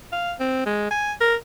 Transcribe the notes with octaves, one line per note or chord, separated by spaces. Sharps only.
F5
C4
G#3
G#5
A#4